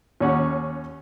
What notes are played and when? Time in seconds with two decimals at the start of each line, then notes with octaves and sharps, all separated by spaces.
0.21 D#2 C#4 F#5